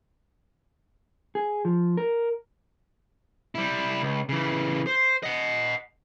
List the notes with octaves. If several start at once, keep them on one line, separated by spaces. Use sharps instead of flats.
G#4
F3
A#4
G3 E4
C#2
C#3 E3
C5
D#5 F#5